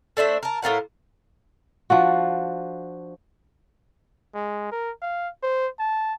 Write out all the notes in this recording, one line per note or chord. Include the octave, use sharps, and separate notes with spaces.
A3 D4 C5 E5
A#4 A5
A2 F4 A#4 F#5
F3 D4 F#4
G#3
A#4
F5
C5
A5